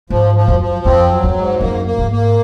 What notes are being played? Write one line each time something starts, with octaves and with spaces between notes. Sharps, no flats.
G#2 F3
F3
F#2
F3
F2 C4
F#3
F#2
G#2
F#2 A#3
A#3
G#2
A#3